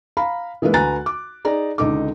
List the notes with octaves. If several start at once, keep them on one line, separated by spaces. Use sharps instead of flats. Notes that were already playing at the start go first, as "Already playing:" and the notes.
F5 A#5 B5
E3 G#3 A#3 E4 B4
D2 B4 G#5 A#5 F#6 A6
D6
D#4 G#4 D5 A#5
C#2 D3 D#4 A4 D6